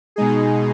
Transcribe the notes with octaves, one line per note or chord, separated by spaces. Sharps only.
B2 G#3 D#4 G#4